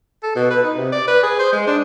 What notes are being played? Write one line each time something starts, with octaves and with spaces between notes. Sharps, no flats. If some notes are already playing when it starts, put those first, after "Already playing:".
A4
B2
B4
D#4
C3
D5
B4
G#4
C5
G#3
D4